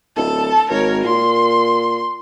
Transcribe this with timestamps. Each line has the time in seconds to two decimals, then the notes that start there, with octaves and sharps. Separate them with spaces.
0.16 D1 A4 A5
0.70 G#1 A#4 C#5
1.04 A#2 C6